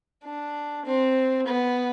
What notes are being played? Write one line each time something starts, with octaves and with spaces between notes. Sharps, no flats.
D4
C4
B3